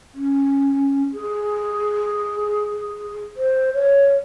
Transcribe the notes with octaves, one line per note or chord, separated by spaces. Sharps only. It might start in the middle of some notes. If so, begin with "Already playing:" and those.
C#4
G#4
C5
C#5